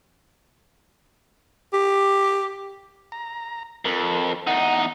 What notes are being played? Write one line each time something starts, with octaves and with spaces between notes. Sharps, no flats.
G4
A#5
F2 A#4
E2 D#4 F#5